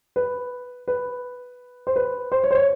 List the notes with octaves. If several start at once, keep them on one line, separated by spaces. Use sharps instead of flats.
B4
B4
C5
B4
C5
C#5
C5
C#5